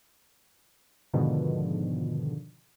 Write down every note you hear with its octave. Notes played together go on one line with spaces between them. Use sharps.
G#2 B2 D3 D#3 F3